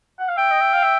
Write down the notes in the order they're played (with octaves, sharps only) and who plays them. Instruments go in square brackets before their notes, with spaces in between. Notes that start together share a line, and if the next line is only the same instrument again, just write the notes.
[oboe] F#5
F5
[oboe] E5 [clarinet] G5
[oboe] D#5
E5
F5
E5